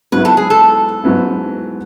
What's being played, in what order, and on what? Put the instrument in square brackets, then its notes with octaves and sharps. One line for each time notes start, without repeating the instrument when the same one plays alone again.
[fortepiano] G#2 F#3 B3 E4 [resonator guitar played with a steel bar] B4
[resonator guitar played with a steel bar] A4
G#4
A4
[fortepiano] G#2 F#3 B3 E4